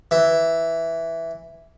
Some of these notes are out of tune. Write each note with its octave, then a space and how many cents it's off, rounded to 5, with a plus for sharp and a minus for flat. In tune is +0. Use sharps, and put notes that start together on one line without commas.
E3 +0